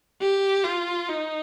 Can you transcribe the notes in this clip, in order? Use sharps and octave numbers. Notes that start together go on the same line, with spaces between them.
G4
F4
D#4